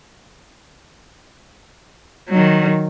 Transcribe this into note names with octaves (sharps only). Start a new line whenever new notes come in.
D#3 F#3